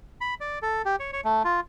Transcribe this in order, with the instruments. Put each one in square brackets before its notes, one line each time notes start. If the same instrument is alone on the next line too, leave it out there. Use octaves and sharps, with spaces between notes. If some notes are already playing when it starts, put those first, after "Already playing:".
[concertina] B5
D5
A4
G4
C#5
C#5
A3
F4